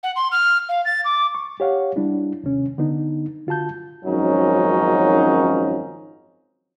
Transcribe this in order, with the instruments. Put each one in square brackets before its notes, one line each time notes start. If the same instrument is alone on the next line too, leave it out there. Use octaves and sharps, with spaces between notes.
[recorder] F#5
C6
F6
F5
A6
D6
[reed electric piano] C#6
G4 C#5 F5 F#5
G3 D4 E4
D#2 C3 C#4
D3 B3 D#4
D3 F4 F#4 A5 G6
[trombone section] G#1 F#2 F3 F#3 C#4 D#4